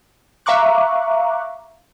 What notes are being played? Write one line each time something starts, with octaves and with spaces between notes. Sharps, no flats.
E5 F5 A#5 C#6 D6 F#6